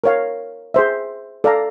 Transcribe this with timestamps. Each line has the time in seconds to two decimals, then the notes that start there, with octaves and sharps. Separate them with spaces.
0.04 A#4 C#5 F5
0.74 G#4 C5 E5
1.44 A4 D5 F5 A#5